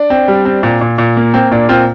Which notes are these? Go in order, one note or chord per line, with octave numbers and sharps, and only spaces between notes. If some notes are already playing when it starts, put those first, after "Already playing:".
Already playing: D4
C4
G3
C4
A#2
A#2
A#2
A#3
A#3 C4
A#2 D4
A#3 C4 F4